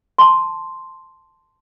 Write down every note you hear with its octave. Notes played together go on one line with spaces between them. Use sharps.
A5 C6